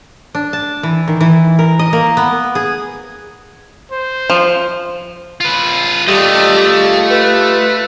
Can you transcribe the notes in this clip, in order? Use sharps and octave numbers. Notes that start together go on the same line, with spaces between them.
D4
A5
E3
D#3
E3
A#4
D#5
A#3
B3
G#4
C5
F3
F4 B4
G3 A3 F4 G4 D#5
B4